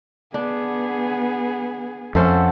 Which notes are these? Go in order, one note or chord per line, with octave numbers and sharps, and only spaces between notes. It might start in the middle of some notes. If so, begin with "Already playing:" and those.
B3 D4 G#4
F2 C#4 A4 C5 E5 F#5